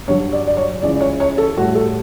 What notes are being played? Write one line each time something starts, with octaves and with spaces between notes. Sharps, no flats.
G2 D3 F#3 C#5
D5
D5
C#5
C#2 C#3 E3 D5
C#5
C#5
A4
A2 G3 F#4
A4